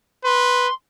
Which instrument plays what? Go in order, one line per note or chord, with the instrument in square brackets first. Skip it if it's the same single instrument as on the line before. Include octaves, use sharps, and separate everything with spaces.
[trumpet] B4 [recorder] C6